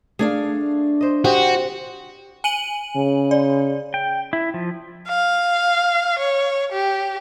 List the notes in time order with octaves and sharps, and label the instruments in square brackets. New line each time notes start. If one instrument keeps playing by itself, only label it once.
[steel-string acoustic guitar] A3 D4 F5 [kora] G#4
[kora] C5 D#5
[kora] C4 D#5 G5 [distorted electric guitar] F#4 [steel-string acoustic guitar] G4
[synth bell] G#5 D#7 F#7
[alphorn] C#3
[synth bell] D5
[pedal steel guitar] G5
E4
F3
[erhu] F5
C#5
G4